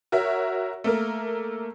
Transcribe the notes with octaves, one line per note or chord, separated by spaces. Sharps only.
F#4 A#4 C#5 E5
A3 A#3 A#4